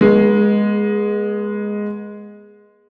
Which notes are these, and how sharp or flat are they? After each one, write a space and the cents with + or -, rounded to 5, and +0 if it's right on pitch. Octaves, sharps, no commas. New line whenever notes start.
G#3 +0 B3 -40